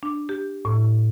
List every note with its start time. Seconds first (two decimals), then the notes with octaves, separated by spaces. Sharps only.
0.03 D4
0.29 G4
0.65 A2